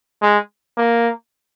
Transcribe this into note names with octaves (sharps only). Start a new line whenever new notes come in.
G#3
A#3